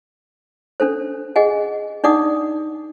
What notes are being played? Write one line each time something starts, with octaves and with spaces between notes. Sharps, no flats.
C#4 D4 A4 C5
G#4 D#5 F#5 G#5
D4 D#4 D5 F#5 D6 D#6